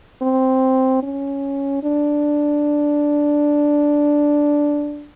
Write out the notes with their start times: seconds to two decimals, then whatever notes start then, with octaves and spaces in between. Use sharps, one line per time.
0.22 C4
1.03 C#4
1.83 D4